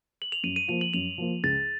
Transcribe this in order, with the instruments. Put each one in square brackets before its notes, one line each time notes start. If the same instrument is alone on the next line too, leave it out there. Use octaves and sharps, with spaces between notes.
[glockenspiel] F#7
F7
[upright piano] F#2 [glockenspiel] D#7
[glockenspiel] D#7
[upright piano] F3 A#3 F4 [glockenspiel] F7
[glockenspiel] F#7
[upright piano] F#2 [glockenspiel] F7
[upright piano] F3 A#3 F4
[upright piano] C#2 [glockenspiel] A6